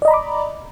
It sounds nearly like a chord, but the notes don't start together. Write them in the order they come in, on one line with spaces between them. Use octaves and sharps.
D5 D#5 A#5 B5 D6